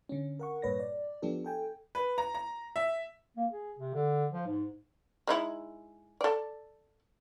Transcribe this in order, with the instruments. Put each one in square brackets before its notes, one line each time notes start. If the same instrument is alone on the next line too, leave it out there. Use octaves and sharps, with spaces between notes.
[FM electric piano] D3 C#4
A#4 F#5 C#6
G2 A#2 B4 C#5 A#6
D5
F3 B3 D4 G4 A4
A4 G5 G#5
[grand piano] B4
A#5
A#5
E5
[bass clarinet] A#3
G#4
C3
D3
F3
G#2
[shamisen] G#3 D#4 E4
A4 D5